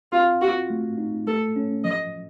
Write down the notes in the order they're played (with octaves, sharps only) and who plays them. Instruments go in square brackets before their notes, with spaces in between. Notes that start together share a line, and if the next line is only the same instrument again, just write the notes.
[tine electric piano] C4 [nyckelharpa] F4
[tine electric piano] F4 [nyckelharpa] F#4
[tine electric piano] A3
D#4
[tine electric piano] A3 [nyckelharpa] A4
[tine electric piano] C#4
[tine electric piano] F3 [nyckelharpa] D#5